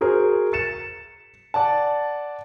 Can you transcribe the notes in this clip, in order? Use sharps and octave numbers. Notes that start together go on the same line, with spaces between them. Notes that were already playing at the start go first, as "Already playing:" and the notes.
F#4 G#4 A#4 C5
A6 C#7 E7
D5 F#5 A5